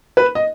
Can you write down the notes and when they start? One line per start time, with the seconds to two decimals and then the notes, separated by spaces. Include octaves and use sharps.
0.17 B4
0.35 D#5